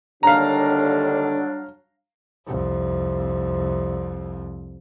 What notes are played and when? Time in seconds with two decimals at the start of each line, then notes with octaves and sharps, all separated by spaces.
0.23 D#2 D3 F#3 G3 D4 F5 A#5
2.47 C2 F2